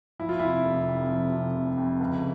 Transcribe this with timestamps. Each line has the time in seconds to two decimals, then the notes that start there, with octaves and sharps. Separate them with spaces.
0.19 F3 E4
0.29 F4
0.39 C3 E4
0.65 F1
0.87 F2
1.10 F3
1.32 C3
1.55 F1
1.77 F2
2.00 C#2